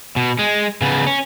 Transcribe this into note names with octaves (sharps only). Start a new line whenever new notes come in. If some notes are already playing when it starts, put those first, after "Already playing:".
B2
G#3
C#3 B3
C#4